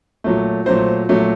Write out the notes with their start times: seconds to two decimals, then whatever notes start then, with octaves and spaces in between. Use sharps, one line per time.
0.24 A#2 F#3 A3
0.66 A#2 F#3 A3 C5
1.09 A#2 F#3 A3